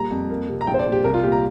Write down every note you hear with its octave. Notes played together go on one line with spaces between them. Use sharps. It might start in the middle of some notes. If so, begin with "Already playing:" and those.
Already playing: A#2 G3 A#5
F2
A#3
C3
A#5
A#1 G5
C5
D5
A#2
G4
C2 A#4
F4
A#2 G4
A#5